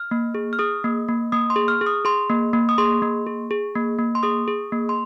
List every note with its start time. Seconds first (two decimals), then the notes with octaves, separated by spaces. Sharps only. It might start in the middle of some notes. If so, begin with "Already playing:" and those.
Already playing: F6
0.11 A#3
0.35 G#4
0.53 F6
0.59 G#4 D#6
0.84 A#3
1.08 A#3
1.32 A#3 D#6
1.50 C6
1.56 G#4
1.68 F6
1.81 G#4
1.86 D#6
2.05 G#4 C6
2.29 A#3
2.53 A#3
2.69 D#6
2.78 G#4 C6
3.02 A#3
3.26 G#4
3.51 G#4
3.75 A#3
3.98 A#3
4.15 C6
4.23 G#4 D#6
4.48 G#4
4.72 A#3
4.89 C6